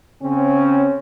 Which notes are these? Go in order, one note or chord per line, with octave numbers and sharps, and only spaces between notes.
C#3 C4 C#4